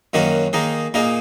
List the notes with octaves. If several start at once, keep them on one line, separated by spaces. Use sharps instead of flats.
F#2 D#3 A#3 C#4 F#4
D#3 A#3 D#4 G#4
A#2 A#3 D#4 G#4